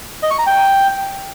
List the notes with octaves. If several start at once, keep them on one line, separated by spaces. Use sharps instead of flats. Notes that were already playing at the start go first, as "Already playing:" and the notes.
D#5
C#6
A#5
G5